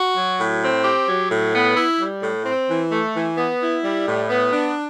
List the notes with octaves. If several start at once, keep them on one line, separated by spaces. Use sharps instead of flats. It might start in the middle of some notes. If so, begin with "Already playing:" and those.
Already playing: F#4
F#3
A2
C4
G4
F#3
A2
B3
E4
G3
A2
C4
E3
A3
E3
B3
E4
G3
A2
B3
D4